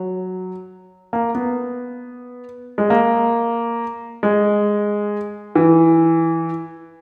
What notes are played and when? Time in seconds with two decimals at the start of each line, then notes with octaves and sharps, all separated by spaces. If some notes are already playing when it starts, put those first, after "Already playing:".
Already playing: F#3
1.13 A#3
1.35 B3
2.78 G#3
2.90 A#3
4.23 G#3
5.55 E3